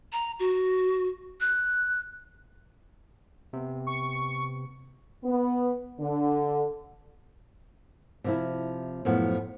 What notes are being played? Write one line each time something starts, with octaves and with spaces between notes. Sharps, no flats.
A#5
F#4
F#6
C3 B3
C#6
B3
D3
C3 F3 E4
F#2 A2 F3 B3